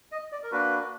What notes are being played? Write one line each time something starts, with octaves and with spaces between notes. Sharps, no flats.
D#5
D5
A#4
A#3 D4 F#4 B4